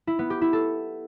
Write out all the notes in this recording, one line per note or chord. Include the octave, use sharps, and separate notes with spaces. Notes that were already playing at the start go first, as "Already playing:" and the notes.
E4
B3
G4
E4
A4